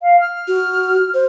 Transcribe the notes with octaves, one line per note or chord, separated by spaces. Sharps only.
F5
F6
F#4
C5